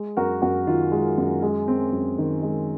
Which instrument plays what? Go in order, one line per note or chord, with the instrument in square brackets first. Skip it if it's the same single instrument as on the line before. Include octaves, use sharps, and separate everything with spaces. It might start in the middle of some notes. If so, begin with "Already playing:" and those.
Already playing: [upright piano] G#3
F#2 F#4 A#4
F#2 F#4
D#3 F4
G#3
F#2
G#3
C4
F#2
D#3
G#3